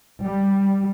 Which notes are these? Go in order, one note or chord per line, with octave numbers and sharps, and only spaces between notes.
G3